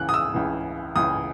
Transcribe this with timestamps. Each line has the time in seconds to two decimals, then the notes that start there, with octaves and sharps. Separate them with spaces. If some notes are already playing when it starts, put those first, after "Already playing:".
Already playing: C#2 C#3 E3 F#6
0.09 D#6
0.14 E6
0.34 C#2 C#3 E3
0.96 C#2 C#3 E3 D#6